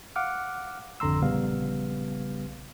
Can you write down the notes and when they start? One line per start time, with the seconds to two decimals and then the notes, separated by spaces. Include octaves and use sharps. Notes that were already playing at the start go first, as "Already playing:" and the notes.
0.16 F5 F#5 D6 F6
1.00 G#1 F2 D3 A#5 C6 E6
1.22 A#1 C#3 G3 B3 F5